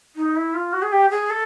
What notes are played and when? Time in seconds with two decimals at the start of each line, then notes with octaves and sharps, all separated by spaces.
0.16 D#4
0.36 E4
0.54 F4
0.73 F#4
0.82 G#4
0.92 G4
1.10 G#4
1.30 A4